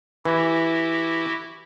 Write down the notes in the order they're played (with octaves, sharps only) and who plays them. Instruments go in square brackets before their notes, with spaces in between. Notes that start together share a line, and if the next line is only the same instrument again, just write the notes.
[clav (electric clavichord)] E3 [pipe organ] E4 F#4 G4